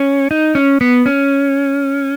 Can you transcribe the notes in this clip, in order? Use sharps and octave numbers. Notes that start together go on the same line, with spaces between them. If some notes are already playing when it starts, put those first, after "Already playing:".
Already playing: C#4
D#4
C#4
B3
C#4